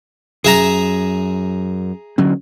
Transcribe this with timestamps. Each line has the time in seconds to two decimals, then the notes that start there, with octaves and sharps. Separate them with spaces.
0.45 F#2 G#4 E5 A#5
2.18 D3 F#3 C#4